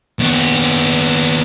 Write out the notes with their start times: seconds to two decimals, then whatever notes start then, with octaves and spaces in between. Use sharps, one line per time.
0.20 D#2 B3